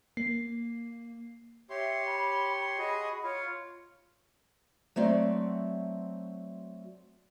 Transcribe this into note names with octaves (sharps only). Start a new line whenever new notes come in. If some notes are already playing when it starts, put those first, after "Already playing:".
A#3 C7
G4 C#5 E5 C6
B5
F#4 G#4 D#5 B5
F4 C#5
F#3 A3 C4 F#4 D5